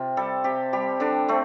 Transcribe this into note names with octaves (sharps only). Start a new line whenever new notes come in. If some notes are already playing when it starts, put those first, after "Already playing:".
Already playing: C3 F4
G3 A4
C3 G4
G3 G4
D3 D4
A3 C4